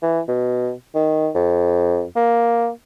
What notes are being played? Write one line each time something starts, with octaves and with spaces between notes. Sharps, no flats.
E3
B2
D#3
F2
A#3